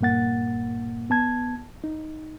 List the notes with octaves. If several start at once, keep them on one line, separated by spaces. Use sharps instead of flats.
G2 A#2 A#3 F#5 A6
B3 A5 G#6
D#4